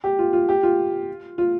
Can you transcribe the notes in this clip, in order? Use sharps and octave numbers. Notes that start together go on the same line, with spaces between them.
G4
F4
F4
G4
F4
F4